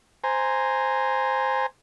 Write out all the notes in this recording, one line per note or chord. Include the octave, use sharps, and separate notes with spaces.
C5 G#5 A#5